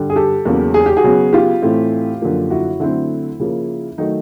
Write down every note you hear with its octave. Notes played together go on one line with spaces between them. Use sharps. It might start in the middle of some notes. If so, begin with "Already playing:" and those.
Already playing: G2 D3 G3
G#4
G4 A4
E2 C#3 F#3 A#3 C#4
G#4
G4
F#4 G#4
C#3 F#3 B3
F4 G4
A2 E3 A3 C4
F#2 D3 F3 A#3
E4 F#4
D3 F#3 A3 C4 E4
C#3 F3 A#3
D#3 F#3 A3 D#4